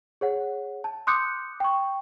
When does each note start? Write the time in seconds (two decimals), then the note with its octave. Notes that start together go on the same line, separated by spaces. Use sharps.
0.21 G#4 C#5 F#5
0.84 A5
1.07 C6 D6 D#6 F#6 G6 C#7
1.60 G5 C#6